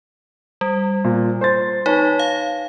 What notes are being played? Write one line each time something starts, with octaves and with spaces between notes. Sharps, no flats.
G3
A#2
C5 C6 A6
D#4 B4 C#5 A5
F5